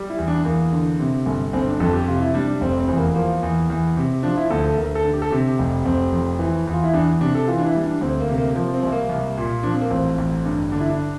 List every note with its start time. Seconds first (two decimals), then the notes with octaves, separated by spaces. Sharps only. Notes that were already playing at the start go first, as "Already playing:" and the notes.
Already playing: G3
0.10 E4
0.18 E2
0.28 D4
0.45 E2 A#3
0.72 D3
0.99 C3
1.26 G1
1.53 G1 C4
1.67 D4
1.80 F2 A4
1.93 G4
2.08 C3 F4
2.20 E4
2.34 G3 D4
2.48 D4
2.61 F1 C4
2.80 C4
2.88 E2
2.98 A#3
3.15 F3 A#3
3.43 E2
3.70 E2
3.97 C3
4.23 F3 D4
4.37 E4
4.50 D2 A4
4.64 A4
4.77 D2 A#4
4.95 A4
5.04 D3
5.14 G4
5.22 A4
5.31 C3 G4
5.59 F1
5.85 F1 C4
6.12 F2
6.39 E3
6.67 E2
6.73 F4
6.84 E4
6.93 E2 D4
7.21 C3 D4
7.35 A4
7.48 E3 F4
7.58 D4
7.66 E4
7.75 G3
7.84 D4
8.01 D2 C4
8.20 A#3
8.29 C3
8.37 A#3
8.55 F3 A#3
8.74 C4
8.83 C2
8.92 A#3
9.09 C2
9.37 A#2
9.63 F3 D4
9.73 C4
9.81 A#3
9.90 A1 C4
10.18 A1
10.45 G2
10.72 D3 D4
10.80 E4
10.90 D4